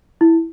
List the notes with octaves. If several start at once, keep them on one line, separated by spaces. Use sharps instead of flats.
E4